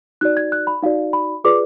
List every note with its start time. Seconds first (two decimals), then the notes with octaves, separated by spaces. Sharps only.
0.21 D#4 F#4 D5 F#6
0.37 G#6
0.52 F#6
0.67 B5
0.83 D#4 F#4 D5 F5
1.13 B5
1.44 F4 G#4 B4 D5 D6